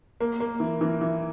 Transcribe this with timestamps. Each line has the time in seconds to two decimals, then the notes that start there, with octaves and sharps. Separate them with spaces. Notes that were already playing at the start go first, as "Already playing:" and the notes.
0.20 A#3
0.40 A#3
0.60 E3
0.81 E3
1.02 E3